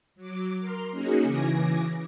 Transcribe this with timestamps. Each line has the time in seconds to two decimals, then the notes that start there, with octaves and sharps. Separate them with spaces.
0.16 F#3 D6
0.60 A#4 C6 F6
0.90 A#3 C#4 D#4 F#4 G#4
1.22 C#3 E3 G#5 D6 A#6